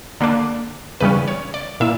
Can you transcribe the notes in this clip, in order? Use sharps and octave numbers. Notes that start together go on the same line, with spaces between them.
D3 A#3 D4
E2 C#3 G3 C#4 B4
C#5
D5
A#2 A#3 E4 E5